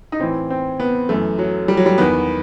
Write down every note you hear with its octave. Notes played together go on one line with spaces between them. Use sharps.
D#4
A2 E3 C4
C4
B3
F#2 E3 A3
F#3
G3
F#3
G3
E2 D#3 B3